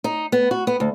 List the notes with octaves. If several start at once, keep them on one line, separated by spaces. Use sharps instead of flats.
D#4
B3
F#4
B3
D2